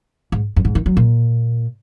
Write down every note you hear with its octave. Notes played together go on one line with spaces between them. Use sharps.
G#2
F#2
G#2
D#3
F#3
A#2